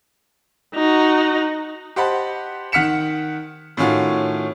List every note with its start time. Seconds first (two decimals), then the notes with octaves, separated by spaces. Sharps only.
0.75 D#4 F#4
1.96 G4 C5 D#5 F#5 A5 B5
2.72 D#3 F#5 F6 B6 C#7 E7
3.77 A2 D#3 C#4 F4 F#4